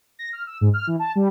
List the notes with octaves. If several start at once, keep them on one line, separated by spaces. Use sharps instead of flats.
A#6
F6
E6
G#2
F6
E3
A5
G3